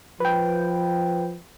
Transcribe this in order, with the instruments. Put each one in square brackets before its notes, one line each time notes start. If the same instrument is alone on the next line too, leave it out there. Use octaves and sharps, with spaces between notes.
[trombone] F3 [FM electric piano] B4 G5